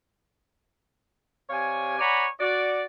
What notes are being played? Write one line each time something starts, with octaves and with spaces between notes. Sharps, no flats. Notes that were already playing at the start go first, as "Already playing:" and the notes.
C3 C#5 D5 F5 G#5
C#5 D5 F#5 G#5 A#5 B5
F#4 D5